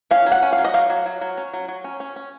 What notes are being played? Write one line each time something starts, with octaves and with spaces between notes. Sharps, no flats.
C#4 F5
F#3
F#5
C#4
F5
F#3
D#5
F#3 F5
F#3
F#3
F#3
C#4
F#3
F#3
C#4
C#4
C#4